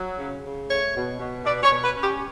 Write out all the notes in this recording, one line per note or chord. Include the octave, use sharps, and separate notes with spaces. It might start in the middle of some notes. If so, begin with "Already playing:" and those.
Already playing: F#3
C#3
C#3
A3 C#5
B2
B2
B2 D5
C#5
B2
B4
C#4
G4